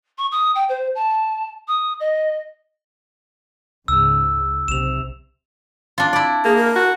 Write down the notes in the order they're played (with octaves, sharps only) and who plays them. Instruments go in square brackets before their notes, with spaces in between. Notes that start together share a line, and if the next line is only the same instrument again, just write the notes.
[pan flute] C#6
D#6
G5
C5
A5
D#6
D#5
[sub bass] C#2 [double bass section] G#2 C#3 [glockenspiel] E6
[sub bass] B1 [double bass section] C3 [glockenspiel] E7 F7
[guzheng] D4 F4
E4 D5
[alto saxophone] A#3 [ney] G#4
[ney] A#4
[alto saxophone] F#4